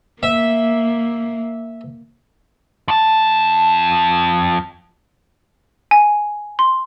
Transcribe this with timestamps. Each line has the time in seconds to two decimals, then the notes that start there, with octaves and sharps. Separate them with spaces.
0.23 A#3 E5
2.88 F2 A5
5.91 G#5
6.59 C6